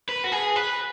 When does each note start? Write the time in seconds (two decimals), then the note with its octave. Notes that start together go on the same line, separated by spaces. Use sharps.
0.09 B4
0.24 F#4
0.32 G#4
0.56 B4